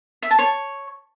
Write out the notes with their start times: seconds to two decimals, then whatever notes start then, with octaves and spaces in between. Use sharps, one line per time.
0.23 E5
0.31 A5
0.39 C#5